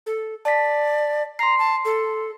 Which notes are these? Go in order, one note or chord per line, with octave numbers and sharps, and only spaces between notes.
A4
D5 A5 B6
A#5 C6 C7
A5
A4